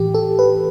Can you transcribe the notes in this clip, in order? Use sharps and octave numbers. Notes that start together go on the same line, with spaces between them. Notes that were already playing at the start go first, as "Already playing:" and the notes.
Already playing: A2 E3 G4
A4
B4